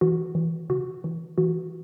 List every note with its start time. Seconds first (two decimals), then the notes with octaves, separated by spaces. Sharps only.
0.01 E3 F#4
0.35 E3
0.70 C#3 F#4
1.04 E3
1.38 E3 F#4